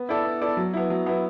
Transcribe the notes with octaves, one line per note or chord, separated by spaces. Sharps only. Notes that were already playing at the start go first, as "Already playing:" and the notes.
Already playing: B3
E4 A4 D5
B3
E4 A4 D5
F#3
B3 E4
F#3
B3 E4